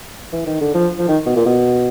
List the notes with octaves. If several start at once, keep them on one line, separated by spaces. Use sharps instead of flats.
E3
D#3
D3
F3
F3
D#3
B2
A#2
B2